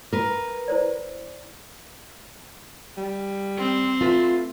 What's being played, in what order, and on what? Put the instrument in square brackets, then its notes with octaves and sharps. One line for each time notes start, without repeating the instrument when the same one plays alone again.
[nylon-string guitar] A#4 B4
[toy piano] E4 C5 D5
[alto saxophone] G3
[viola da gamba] C4
[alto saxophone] A3 [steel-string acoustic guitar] F4 B4